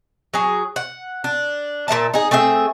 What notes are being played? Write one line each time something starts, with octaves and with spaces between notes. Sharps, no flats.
F#3 G#4
F#5
D4
A#2 A#3 E5 A5
D#4 G#4
A3 C4 G#4 E5